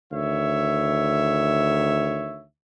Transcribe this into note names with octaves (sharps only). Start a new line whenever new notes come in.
D2 D#3 C#5 E5